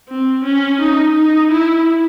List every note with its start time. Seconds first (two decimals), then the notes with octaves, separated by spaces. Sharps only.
0.09 C4
0.44 C#4
0.81 D#4
1.16 D#4
1.51 E4